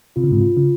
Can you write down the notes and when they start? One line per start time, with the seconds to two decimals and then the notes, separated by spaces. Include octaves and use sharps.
0.16 C3 F4
0.24 C#3
0.32 G#2 C3
0.41 F4
0.57 C#3